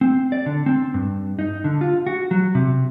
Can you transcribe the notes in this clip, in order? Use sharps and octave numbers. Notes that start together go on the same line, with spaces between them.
C4
D5
D3
C4
G2
D#4
D3
F4
F#4
F#3
C3